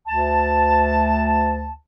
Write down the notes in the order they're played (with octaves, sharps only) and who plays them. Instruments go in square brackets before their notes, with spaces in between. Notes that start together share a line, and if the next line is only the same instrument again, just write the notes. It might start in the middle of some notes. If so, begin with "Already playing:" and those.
[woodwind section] D2 A5